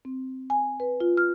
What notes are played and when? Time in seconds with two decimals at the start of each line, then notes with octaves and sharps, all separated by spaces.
0.05 C4
0.50 G#5
0.80 B4
1.00 F4
1.17 F6